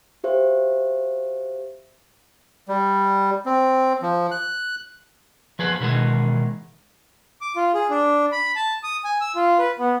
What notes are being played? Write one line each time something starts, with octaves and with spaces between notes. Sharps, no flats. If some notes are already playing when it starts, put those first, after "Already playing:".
F#4 G4 C5 E5 F5
G3
C4
F3
F#6
F3 G#4 B4
B2 D#3 E3 G#3
D6
F4
G#4
D4
B5
A5
D#6
G#5
E6
F4
B4
B3